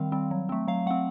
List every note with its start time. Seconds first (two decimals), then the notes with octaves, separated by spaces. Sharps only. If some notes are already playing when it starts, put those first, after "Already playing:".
Already playing: D#3 G3 C4 F5
0.12 G3 C4
0.31 F#3
0.49 A3 C4
0.68 F#3 F5
0.86 A3 C4 F#5